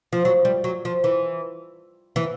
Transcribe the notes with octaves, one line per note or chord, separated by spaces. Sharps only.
F3
F#3
G3
F#3
F3
E3
E3